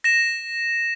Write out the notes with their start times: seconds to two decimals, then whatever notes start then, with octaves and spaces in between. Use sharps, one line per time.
0.04 A#6 E7